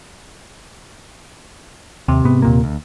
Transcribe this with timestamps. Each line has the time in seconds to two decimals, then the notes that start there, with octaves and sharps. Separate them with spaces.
2.08 D#2 C3
2.24 G#2 B3
2.42 D#2 A#2 A#3
2.64 D2